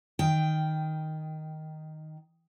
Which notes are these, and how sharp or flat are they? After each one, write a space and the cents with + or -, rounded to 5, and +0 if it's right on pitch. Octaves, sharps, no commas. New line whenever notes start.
D#3 +0 G5 +0